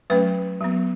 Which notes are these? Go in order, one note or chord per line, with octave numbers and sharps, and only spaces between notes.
F#3 A3 C#4 B4
F#3 B3